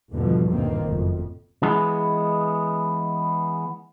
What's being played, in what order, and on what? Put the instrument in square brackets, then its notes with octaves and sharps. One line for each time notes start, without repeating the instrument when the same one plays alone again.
[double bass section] E2 G#2 B2 D3 F3 G3
D2 G2 A#2 D#3 A#3 C4
F#1 F2 A2
[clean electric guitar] E3 G#3 B3